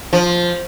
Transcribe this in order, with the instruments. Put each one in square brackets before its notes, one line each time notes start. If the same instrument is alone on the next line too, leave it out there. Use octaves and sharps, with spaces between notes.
[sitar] F3